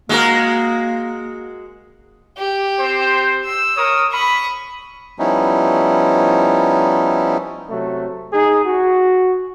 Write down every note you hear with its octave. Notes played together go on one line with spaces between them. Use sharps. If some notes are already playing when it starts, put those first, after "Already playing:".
G#3 A#3 F#4 A#4
G4
C4 C5
E6
A#4 C#5 D#6
B5 C#6 D#6
F3 G3 B3 C#4 D#4 E4
C3 F#3 A3
D#4 G#4
F#4